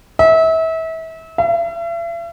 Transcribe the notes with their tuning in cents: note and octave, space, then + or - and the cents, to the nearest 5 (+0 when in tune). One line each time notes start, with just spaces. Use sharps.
E5 -30
E5 +45